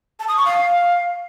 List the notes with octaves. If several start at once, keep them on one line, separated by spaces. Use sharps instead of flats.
A5
D#6
C#6
F5